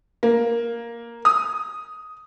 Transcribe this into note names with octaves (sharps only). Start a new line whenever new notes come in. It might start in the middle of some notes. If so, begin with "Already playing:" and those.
A#3
D#6